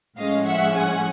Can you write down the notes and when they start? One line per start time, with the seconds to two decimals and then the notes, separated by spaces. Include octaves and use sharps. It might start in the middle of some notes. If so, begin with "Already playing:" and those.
0.17 A2 F3 G#3 C#4 D#5 F5
0.46 E5 F#5
0.75 F#5 G#5